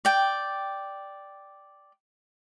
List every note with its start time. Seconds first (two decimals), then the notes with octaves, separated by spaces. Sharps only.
0.05 D5 G5